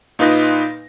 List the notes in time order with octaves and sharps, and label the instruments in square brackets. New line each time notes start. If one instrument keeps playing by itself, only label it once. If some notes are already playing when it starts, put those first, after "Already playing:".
[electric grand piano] A#2 D#4 F4 B4 D#6 A#6